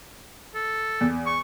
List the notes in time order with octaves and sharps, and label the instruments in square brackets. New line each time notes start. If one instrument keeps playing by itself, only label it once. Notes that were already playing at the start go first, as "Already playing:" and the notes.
[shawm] A4
[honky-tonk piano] E2
[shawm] C#6